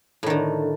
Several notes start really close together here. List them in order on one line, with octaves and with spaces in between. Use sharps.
A2 D#3 D3